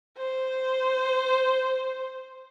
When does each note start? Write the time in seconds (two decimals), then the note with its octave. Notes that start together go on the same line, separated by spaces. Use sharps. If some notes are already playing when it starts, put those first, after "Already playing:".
0.17 C5